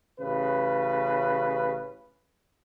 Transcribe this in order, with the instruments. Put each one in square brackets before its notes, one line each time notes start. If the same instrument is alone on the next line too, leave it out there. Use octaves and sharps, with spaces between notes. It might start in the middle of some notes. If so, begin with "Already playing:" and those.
[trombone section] A1 C#3 B4